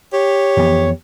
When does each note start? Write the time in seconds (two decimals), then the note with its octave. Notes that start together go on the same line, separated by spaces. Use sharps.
0.13 G4 C#5
0.57 F2 E3 B3